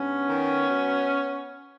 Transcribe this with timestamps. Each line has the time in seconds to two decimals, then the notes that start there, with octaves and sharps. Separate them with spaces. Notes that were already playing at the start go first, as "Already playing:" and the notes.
Already playing: G2 B3 C#4
0.29 D#3
0.70 F#3